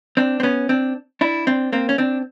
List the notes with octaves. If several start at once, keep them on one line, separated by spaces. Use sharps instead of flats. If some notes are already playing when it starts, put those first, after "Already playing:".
C4 D4
C4
B3 C#4
C4 D4
D4 E4
C4 D4
A#3 C4
C#4
C4 D4